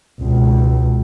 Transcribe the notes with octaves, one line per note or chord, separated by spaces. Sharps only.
C#2 B2